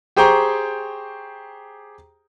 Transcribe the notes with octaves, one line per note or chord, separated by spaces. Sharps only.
G4 G#4 C5 G5 A#5 C#6